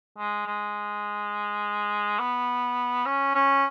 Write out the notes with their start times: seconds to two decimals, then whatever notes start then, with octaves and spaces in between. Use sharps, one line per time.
0.18 G#3
0.46 G#3
2.19 B3
3.05 C#4
3.35 C#4